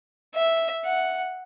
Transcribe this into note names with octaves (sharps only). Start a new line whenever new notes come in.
E5
F#5